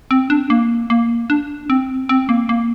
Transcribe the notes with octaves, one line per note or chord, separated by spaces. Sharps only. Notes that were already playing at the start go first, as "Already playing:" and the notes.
C4
D4
A#3
A#3
D4
C4
C4
A#3
A#3